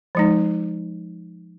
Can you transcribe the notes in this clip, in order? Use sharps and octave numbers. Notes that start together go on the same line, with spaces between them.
F3 G#3 D#4